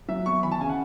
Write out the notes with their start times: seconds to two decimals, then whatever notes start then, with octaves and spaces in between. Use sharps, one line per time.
0.08 F#3 E5
0.26 B3 C#6
0.43 E3 B5
0.52 A5
0.61 C#3 G#5
0.69 F#5